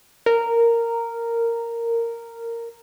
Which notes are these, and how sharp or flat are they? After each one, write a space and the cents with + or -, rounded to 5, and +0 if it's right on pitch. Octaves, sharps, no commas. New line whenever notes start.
A#4 -10